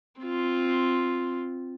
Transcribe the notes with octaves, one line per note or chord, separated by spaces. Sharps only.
C4 F4